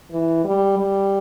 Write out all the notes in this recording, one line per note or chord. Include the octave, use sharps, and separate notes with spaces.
E3
G3
G3